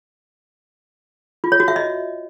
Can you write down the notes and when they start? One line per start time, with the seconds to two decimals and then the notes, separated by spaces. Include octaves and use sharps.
1.44 F4
1.52 C#5
1.60 F#4
1.68 E5
1.76 D#5